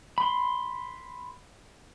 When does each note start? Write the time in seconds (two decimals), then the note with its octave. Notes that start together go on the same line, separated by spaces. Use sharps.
0.18 B5 C6